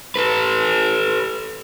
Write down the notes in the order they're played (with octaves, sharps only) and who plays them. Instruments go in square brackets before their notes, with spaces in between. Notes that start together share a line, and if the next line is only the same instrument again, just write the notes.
[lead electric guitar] A4 B4